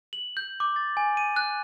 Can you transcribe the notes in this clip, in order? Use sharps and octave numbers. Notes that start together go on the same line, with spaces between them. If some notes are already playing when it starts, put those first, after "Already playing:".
F#7
G6
D6
A6
G#5
D#7
F#6